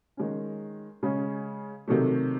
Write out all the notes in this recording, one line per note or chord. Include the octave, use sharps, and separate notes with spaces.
D#3 G#3 C#4
C#3 G#3 C#4
C3 D#3 F#3 A3